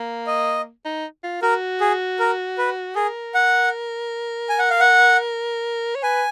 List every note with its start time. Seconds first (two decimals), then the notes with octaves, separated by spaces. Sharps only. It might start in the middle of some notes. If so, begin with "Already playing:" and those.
Already playing: A#3
0.27 D#5
0.85 D#4
1.24 F4
1.42 F#4 A#4
1.81 G#4
2.19 A#4
2.58 B4
2.95 G#4 A#4
3.34 F#5
4.49 G#5
4.59 F#5
4.70 F5
4.80 F#5
5.95 C#5
6.03 B4 G#5